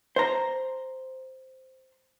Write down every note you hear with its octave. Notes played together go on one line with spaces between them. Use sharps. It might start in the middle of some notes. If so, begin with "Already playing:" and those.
C5 A#5